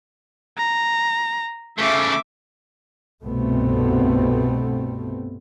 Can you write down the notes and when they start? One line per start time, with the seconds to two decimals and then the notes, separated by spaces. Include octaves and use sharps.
0.57 A#5
1.78 C#3 A3 E5 D6
3.23 C2 G2 B2 A3 B3 C4